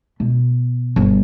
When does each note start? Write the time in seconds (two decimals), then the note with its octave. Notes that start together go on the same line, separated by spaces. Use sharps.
0.20 B2
0.96 G1